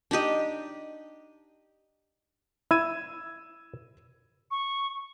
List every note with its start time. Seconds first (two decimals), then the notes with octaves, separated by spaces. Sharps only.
0.11 D4 D#4 G4 D#5
2.71 E4 E6 G#6 D#7
4.51 C#6